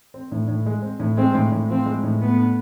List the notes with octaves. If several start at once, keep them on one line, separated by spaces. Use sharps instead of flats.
C4
A2
A2
G#3
C4
A2
G#3 C4
A2
A2
F3 C4
G#3
A2
A3 B3
D4